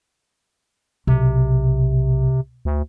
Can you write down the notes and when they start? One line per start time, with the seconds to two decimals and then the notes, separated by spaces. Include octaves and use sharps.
1.07 B1 C3
2.65 D2